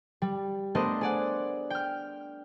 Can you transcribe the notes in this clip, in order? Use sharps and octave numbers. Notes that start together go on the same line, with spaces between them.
G3
A3 B3 D4 A#4 C5 D#5
G#4 D5 F#5
G5 F6